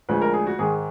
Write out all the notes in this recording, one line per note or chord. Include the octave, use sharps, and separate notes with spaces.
D2 D3 F3 G#3 B4
A#4
G#4
F#4
G#2 D#3 G#3 G#4